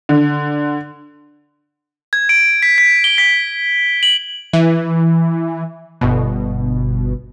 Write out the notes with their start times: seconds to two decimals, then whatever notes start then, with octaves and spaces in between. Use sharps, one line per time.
0.09 D3
2.13 G#6
2.29 D7
2.62 B6
2.78 B6
3.04 G7
3.18 B6
4.03 F#7
4.53 E3
6.01 G1 B2